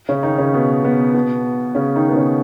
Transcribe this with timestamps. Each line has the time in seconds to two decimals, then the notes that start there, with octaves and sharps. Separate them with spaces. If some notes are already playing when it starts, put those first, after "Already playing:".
0.09 C#3 C#4
0.23 D#3 D#4
0.38 C#3 C#4
0.54 B2 B3
0.84 B2 B3
1.14 B2 B3
1.75 C#3 C#4
1.96 D#3 D#4
2.09 B3
2.15 C#3 C#4